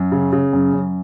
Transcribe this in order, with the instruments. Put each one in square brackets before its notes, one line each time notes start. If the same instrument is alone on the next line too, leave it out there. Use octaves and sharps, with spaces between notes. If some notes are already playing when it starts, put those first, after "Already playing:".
Already playing: [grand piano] F#2
C#3
C#3
F#2
F#2